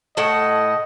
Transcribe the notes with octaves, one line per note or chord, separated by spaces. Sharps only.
A2 D#5 F#5 A5